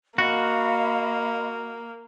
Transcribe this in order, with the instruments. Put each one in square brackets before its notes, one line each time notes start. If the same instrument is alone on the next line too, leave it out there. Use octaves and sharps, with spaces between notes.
[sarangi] A#3 [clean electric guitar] F#4 [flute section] D#5 F5 B5